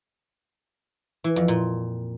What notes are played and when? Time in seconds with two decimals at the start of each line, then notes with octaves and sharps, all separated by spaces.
1.24 E3
1.36 F2
1.48 A#2